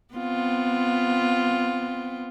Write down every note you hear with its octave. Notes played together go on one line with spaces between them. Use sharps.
B3 C4 F4